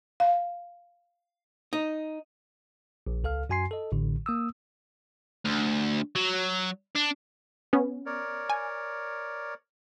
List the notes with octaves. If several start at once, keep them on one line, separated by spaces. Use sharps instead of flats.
F5
D#4
A#1
C#2 A4 F5 F6
F#2 F#4 G#5 C6 C7
A4 D#5
A1 A2 D3
A#3 D#6 E6
D2
F#3
D4
B3 C#4
A#4 C#5 D5
G#5